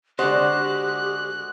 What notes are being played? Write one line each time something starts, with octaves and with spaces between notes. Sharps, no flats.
D3 G#3 F#4 G4 C5 D#5 F#6